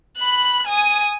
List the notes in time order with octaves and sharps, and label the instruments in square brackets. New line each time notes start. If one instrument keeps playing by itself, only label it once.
[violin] B5 F#6
G#5 D#6